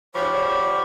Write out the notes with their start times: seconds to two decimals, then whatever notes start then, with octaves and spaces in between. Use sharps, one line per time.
0.15 G#2 C#3 F3 G4 C#5 B5 C#6
0.33 F2 D3 F3